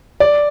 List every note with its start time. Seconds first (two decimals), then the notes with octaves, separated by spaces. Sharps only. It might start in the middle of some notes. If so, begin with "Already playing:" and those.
0.20 D5